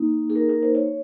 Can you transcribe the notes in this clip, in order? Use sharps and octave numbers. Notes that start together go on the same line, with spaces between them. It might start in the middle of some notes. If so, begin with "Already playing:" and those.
Already playing: A#3 D#4
G#4
A#4
A#4
C5
C#5